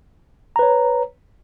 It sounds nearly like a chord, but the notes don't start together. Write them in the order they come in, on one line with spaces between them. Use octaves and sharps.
A#5 B4 C#5